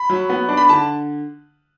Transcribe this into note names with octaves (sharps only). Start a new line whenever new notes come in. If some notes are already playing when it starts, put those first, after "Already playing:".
Already playing: B5
F#3
B3
D4
B5
D3 A5